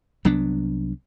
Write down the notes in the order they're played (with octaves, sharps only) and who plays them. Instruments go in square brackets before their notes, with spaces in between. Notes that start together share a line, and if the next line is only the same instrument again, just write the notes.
[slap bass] C2 F#3 B3 D4